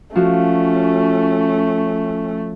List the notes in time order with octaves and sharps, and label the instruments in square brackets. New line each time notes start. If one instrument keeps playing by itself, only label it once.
[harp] F3 F#4 [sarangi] A3 [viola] C#4